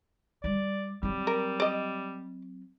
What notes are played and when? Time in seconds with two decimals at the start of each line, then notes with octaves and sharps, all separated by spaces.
0.44 G3 D5
1.03 F#3 G3 C4
1.27 A#4
1.60 D5 D#5